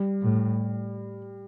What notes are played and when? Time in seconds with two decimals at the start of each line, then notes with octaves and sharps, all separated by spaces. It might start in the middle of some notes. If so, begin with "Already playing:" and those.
Already playing: G3
0.22 A2